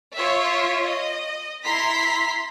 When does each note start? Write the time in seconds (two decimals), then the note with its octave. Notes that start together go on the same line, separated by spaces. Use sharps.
0.15 F4 C#5 E5
0.85 D#5
1.65 E4 A#5 C6 B6